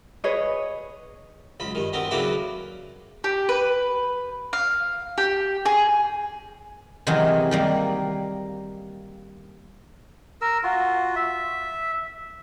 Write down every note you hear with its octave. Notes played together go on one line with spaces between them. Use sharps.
G#4 B4 C#5 D#5
C#2 F#2 B5
G2 D#3
D2 B3 C4 A#4
C#3 F#3 A#3 D4 E4 B4
G4
B4
F5
G4
G#4
C3 D#3 E3 F#3 G#3 D#4
D#3 G3 A#3
A#4 E6
F4 F#4
E5